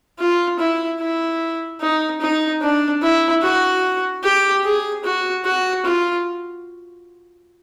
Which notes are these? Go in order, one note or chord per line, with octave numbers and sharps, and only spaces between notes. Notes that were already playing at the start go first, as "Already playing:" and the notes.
F4
E4
E4
D#4
D#4
D4
E4
F#4
G4
G#4
F#4
F#4
F4